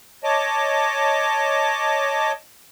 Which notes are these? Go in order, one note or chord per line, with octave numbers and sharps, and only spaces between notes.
C#5 D#5 A5 D6